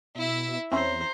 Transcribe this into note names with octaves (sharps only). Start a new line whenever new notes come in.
B2 E4 E5
E2 C4 C#4 E4 C5 A#5